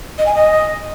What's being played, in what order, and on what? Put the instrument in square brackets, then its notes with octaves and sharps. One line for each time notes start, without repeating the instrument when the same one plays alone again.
[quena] D#5
G#5
D#5